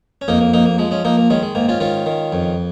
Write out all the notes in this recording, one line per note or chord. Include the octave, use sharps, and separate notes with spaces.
C#4
F2 A#3 D#4
A#3
F2 A#3 D#4
A#3
F3 G#3
G#3 C#4
F3 A#3 D#4
A#3
D#3 G#3 C#4
G#3
G#2 A#3
C#4 F4
D#3 C#4 F4
D#3
F2